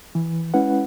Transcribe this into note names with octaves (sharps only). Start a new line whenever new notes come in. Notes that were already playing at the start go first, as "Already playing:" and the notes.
E3
G#3 C#4 E4 B4 F#5